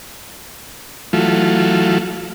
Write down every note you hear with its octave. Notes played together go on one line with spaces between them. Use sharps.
E3 F#3 A3 F4